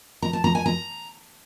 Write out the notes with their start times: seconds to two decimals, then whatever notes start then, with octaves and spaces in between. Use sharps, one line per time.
0.22 A#5
0.33 A5
0.44 A#5
0.55 G#5
0.66 A#5